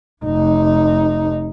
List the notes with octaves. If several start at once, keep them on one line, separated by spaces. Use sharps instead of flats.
F1 D#4